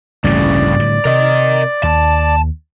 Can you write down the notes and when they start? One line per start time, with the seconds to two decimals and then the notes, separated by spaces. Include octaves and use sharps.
0.24 A1 D2 G2 C#3 E3 D5
0.79 A2 D3 G3
1.05 C3 A#4 D#5
1.83 D#2 A5